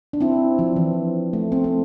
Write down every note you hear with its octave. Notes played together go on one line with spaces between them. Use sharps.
D4
C4 E4
F3
E3
A3
A3 C4
C4